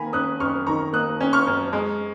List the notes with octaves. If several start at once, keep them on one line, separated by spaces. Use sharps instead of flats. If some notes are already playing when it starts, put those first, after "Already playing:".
Already playing: D#3 A#3 G#5 A#5 B5
C#4 D#6 F#6
F#2 C#6 F6
D#3 A#5 C#6
A#3 D#6 F#6
C#4
C#6 F6
F#2
G#3